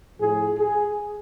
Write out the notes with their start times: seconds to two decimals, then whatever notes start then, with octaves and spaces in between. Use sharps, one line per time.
0.19 A2 F3 G#4
0.57 G#4